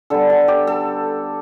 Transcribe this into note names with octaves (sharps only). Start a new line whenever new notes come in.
D3 G3 B3 A4
A4
G4
A4